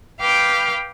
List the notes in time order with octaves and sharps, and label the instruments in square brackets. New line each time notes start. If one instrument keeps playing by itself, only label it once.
[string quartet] B4 F5 G5 D6 F6 G6